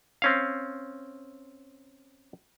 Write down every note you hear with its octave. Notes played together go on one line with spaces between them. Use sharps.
C4 C#4 F5